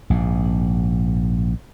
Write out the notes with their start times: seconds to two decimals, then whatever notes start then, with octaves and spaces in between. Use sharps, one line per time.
0.10 A#1 G#2